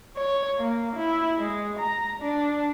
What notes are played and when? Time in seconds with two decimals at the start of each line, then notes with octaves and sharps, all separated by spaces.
0.17 C#5
0.59 A#3
0.96 E4
1.38 G#3
1.79 A#5
2.20 D4